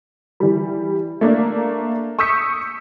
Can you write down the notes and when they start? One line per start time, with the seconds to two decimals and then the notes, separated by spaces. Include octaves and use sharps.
0.40 E3 G3
1.21 A3 A#3 D4
2.19 C#6 D#6 E6 G6 B6 C#7